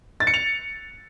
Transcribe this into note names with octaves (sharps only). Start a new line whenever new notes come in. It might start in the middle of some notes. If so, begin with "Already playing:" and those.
A6
C#7
F7